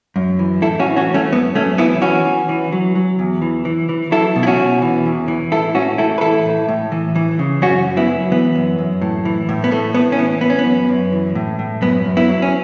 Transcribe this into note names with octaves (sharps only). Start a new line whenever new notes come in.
F#2
E3
A2 E4 A4
C#4 F#4
E3
C#4 F#4
A2
A3 C#4
F#2 B3
F#2 A3 C#4
E3 B3 E4
E3 C#4 F#4
E3
E3
F#3
F#3
E2
E3
E3
E3
F#3 E4 A4
B2
E4
C#4 F#4
B2
E3
E2
E3
A2 E4 A4
A2 C#4 F#4
A2 E4 A4
B4
E3 E4 A4
A2
A2
E3
E3
C#3
F#2 C#4 F#4
F#2
B3 E4
F#3
E3 B3
F#2
F#2
A2
E3
A2
B3
A2 A3
A2 B3
C#4
E3 B3
E3 B3
C#4
B3
F#2
F#2
E3
A2
A2
F#2 B3
F#2
B3 E4
F#3
C#4